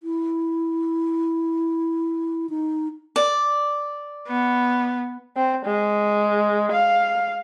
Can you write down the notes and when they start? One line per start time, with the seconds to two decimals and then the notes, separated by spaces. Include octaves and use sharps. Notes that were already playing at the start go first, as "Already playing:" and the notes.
0.03 E4
2.49 D#4
3.16 D5
4.27 B3
5.37 C4
5.66 G#3
6.72 F5